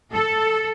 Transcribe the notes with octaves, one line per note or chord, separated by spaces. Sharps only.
A4